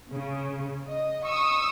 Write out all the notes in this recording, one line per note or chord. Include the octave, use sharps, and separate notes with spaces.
C#3
D#5
C#6 D#6 E6